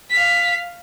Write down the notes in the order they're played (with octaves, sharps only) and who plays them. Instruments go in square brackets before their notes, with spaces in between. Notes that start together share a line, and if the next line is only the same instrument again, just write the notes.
[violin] F5 B6